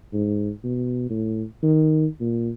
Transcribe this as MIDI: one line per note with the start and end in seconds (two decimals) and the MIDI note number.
0.13 0.50 44
0.64 1.06 47
1.10 1.44 45
1.63 2.07 51
2.21 2.50 46